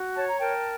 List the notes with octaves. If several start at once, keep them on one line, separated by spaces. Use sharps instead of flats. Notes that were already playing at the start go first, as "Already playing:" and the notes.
Already playing: F#4
C#5 A5
A#5
A#4 G5 A5